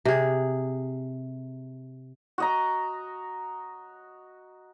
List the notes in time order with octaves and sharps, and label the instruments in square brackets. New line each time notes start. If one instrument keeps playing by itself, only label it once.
[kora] C3 G#4
[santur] F#4 D#5 A#5